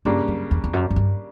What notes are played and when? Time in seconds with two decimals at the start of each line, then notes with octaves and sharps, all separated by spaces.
0.05 G2 C#3 G3 A#3 D4
0.28 F#2
0.51 E2
0.64 E2
0.73 F#2
0.90 F#2
0.96 G2